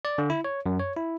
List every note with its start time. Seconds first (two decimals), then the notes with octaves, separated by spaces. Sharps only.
0.05 D5
0.18 D3
0.30 E4
0.44 C#5
0.66 F#2
0.80 C#5
0.97 E4